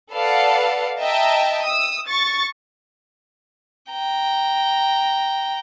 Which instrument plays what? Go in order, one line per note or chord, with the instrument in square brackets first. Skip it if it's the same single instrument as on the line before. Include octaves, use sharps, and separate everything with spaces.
[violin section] A4 B4 D5 F5 F#5
D#5 E5 G5 A5 A#5
D#6 E6
C#6 A6
[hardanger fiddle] G5 A#5